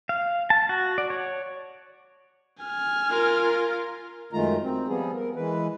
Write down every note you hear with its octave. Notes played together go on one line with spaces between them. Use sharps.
F5
A5
F#4
D5
C#5
G#5 F6
F4 A#4
F#2 D#3 G#3 A3 F4 A#5
C4
F3 G3 B3 G#4
A#4
E3 G#3 B4